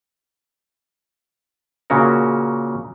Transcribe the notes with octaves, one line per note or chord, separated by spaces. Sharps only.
A#2 C#3 C#4 F#4 A#4